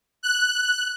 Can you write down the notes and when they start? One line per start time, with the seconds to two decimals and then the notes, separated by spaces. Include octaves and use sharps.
0.23 F#6